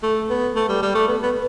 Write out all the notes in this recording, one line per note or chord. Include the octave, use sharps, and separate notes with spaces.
A3
B3
A3
G3
G3
A3
B3
B3